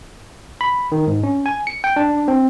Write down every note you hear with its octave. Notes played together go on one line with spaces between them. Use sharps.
B5
D#3
G#2
C#4
G#5
C#7
G5
D4
C4